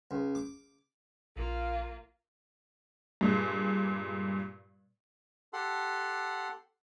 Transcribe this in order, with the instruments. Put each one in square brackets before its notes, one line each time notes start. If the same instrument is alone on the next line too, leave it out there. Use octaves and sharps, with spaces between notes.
[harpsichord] C#2
D6
[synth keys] A#1 [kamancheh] A#3 F4
[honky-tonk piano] G2 A#2 G#3
[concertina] G4 A4 F#5 C6